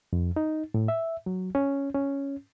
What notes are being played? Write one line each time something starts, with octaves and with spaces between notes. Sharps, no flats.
F2
D#4
A2
E5
F#3
C#4
C#4